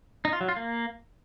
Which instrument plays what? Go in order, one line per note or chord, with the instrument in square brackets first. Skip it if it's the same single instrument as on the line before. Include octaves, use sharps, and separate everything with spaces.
[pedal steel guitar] D#4
F4
F#3
F4
A#3